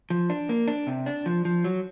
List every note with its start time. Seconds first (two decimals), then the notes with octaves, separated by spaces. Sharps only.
0.10 F3
0.30 D4
0.49 A#3
0.68 D4
0.87 C3
1.06 D4
1.26 F3
1.45 F3
1.64 F#3